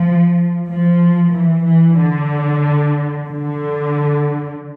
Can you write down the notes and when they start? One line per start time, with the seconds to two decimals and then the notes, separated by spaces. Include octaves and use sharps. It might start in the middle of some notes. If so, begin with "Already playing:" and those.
Already playing: F3
0.68 F3
1.33 E3
1.66 E3
1.99 D3
3.30 D3